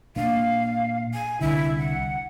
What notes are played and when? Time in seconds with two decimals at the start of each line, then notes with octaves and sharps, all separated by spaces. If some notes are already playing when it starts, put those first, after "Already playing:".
0.16 A#2 A#3 D4 F5
1.13 G#5
1.41 C2 D3 E4
1.78 F#5